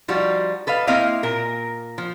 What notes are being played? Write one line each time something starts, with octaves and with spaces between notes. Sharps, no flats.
F3 G3 D#4 F4 F#4
A4 B4 D#5 F5
A#3 C4 E4 C5 D#5 F5
A#2 A#4
F3